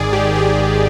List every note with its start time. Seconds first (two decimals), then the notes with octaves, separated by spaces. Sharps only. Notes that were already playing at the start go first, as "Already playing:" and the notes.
Already playing: G#1 G#2 D#3 G#4 D5
0.13 G#2 G4
0.35 G#2 G#4
0.58 G#2